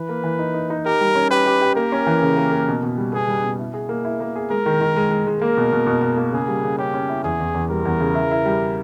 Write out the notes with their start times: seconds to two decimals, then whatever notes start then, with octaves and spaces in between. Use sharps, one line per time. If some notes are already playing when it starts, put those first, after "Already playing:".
Already playing: E3 B4
0.09 A#3
0.24 E3
0.39 D#4
0.54 D#4
0.70 D#4
0.85 G4 A#4
1.01 G3
1.15 C#4
1.31 G4 B4
1.46 G4
1.61 G4
1.76 A#3 A#4
1.92 C#4
2.07 E3
2.22 C#3
2.37 A#3
2.52 A#3
2.68 B2
2.83 B2
2.98 G3
3.13 B3 G#4
3.28 G3
3.44 B2
3.59 E4
3.74 G#4
3.89 A#3
4.05 E4
4.20 A#3
4.36 G#4
4.50 G#3 A#4
4.66 D#3
4.81 D#3
4.96 G#3
5.11 G#3
5.27 G#3
5.42 A#3 A#4
5.57 B2
5.72 B2
5.87 B2
6.02 B2
6.17 A#3
6.32 C#3 G#4
6.48 G3
6.64 C#3
6.78 C#4 G4
6.94 C#4
7.09 E4
7.24 E2 G#4
7.40 E2
7.54 E2
7.70 G3 A#4
7.85 E2
8.00 C#3
8.15 E4
8.31 E4
8.46 G3